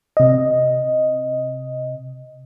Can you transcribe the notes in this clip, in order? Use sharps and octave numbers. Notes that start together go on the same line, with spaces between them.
C3 D#5